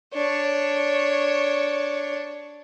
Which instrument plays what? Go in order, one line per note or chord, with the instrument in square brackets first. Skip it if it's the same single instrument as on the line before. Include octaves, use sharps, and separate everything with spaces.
[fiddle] D4 C#5